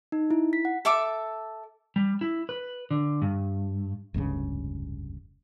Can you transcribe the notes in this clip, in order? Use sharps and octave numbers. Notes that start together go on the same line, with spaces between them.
D#4
E4
B6
F#5
A4 E5 D6
G3
E4
B4
D3
G2
F1 C#2 G2 C#3